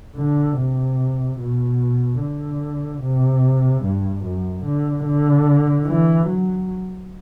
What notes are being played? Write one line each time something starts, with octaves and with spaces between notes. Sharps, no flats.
D3
C3
B2
D3
C3
G2
F#2
D3
D3
E3
F#3